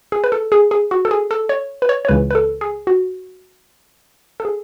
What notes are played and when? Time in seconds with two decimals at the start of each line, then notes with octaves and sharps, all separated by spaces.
0.12 G#4
0.24 B4
0.32 A4
0.52 G#4
0.71 G#4
0.91 F#4
1.05 A4
1.11 G#4
1.31 A4
1.49 C#5
1.82 B4
1.89 C#5
2.05 C#5
2.08 C#2 C#3 E3 B4
2.31 B4
2.35 A4
2.61 G#4
2.87 F#4
4.40 A4
4.45 G#4